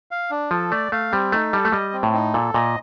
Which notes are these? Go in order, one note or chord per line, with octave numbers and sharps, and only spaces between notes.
F5
D4
F3 A4
A3 D5
A3 F5
G3 C4
A3 D#4
G3 A4
A3
G3 D#5
C4
A2
D#4
A#2 A4
A#2 D#5